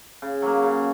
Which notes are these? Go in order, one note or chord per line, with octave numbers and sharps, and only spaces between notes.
C#3
F#3 A#3
C#3